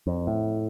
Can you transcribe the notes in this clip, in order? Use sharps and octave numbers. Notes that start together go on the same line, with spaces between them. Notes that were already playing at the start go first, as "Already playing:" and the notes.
F2
A2